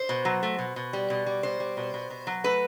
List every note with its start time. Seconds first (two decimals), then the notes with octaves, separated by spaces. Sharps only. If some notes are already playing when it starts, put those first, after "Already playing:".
Already playing: C5
0.09 B2
0.25 F#3
0.43 A3
0.59 B2
0.76 B2
0.93 G3
1.10 B2
1.26 G3
1.43 B2 C5
1.60 G3
1.77 B2
1.94 B2
2.10 B2
2.27 F#3
2.44 A3 B4